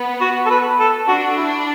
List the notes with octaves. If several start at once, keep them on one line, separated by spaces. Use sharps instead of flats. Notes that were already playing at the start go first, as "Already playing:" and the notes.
Already playing: B3
F#4
A4
B4
A4
D4 F#4
E4